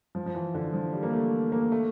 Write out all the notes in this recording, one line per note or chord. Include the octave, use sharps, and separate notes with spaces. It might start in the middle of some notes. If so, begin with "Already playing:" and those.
F3
F3
E3
D3
F3
G3
A#3
A3
A#3
A3